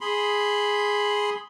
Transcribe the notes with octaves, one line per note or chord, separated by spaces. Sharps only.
G#4 B5 C6